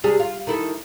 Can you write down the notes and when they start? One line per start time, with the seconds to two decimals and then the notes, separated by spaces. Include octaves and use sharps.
0.04 C3 G3 G#4
0.20 F4
0.47 D#3 E4 A4